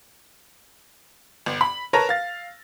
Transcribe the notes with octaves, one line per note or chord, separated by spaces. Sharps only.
G1
B5
A#4 B4 C#5 A5 A#5 A#6
F5 A6